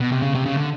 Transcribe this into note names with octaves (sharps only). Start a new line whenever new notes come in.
B2
C3
C#3
C3
C#3
D3